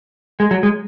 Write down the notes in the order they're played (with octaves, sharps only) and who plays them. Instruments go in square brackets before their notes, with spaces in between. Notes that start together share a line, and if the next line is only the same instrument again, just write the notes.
[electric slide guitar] G#3
F#3
G#3